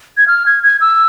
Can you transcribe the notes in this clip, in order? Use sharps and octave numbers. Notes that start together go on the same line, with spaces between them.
G#6
F6
G#6
G#6
E6